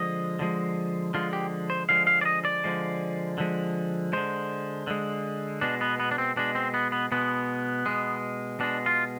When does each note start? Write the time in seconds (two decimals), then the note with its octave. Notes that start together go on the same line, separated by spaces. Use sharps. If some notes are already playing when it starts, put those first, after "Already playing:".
Already playing: D3 F3 G#3 D#5
0.39 D3 F3 G#3
1.14 D3 F3 G#3 F4
1.33 G4
1.70 C5
1.89 D3 F3 G#3 F5
2.07 F5
2.21 D5
2.25 D#5
2.45 D5
2.64 D3 F3 G#3
3.38 D3 F3 G#3
4.13 D3 G#3 C5
4.87 D3 G#3
5.61 B2 G#3 D4
5.81 B3
6.00 B3
6.11 D4
6.18 C4
6.36 B2 G#3 D4
6.55 C4
6.74 B3
6.92 B3
7.12 B2 G#3 B3
7.86 B2 G#3
8.60 B2 G#3 D4
8.86 F4